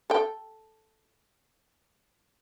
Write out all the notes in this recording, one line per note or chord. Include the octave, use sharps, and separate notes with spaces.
A4 G5